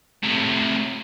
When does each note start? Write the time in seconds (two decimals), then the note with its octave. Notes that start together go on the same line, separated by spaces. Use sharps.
0.23 A2 C3